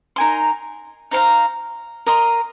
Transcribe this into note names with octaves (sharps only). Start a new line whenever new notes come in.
D#4 A#4 G#5 C6
D#4 C5 F5 A#5
A#4 D#5 C6